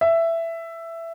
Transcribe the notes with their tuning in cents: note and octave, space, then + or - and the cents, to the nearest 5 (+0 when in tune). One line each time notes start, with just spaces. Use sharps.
E5 +10